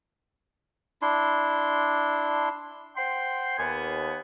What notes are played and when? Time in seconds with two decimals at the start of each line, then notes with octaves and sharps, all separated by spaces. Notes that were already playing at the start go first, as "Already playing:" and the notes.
1.02 D4 E4 C6
2.97 C5 F#5 G5 C6
3.58 D#2 B3 G#5